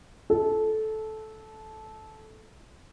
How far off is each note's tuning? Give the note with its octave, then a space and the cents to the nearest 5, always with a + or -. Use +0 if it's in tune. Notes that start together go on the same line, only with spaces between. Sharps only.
A4 -15